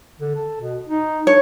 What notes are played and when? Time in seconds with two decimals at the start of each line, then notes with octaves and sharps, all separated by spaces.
0.21 D3
0.35 A4
0.61 B2
0.88 D#4
1.27 D4 C#5